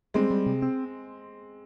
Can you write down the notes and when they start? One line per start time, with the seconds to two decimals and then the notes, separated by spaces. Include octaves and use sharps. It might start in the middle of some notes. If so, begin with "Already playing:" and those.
0.14 G3 G#3 C4
0.31 G3
0.46 C3
0.62 C4